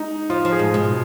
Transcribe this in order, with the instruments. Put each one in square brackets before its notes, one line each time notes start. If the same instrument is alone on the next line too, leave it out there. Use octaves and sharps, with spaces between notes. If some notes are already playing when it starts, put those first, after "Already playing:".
Already playing: [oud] G#3 [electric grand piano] D#4
[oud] F3 [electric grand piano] F4
[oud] F3
[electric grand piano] G#4
[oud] G#2
B2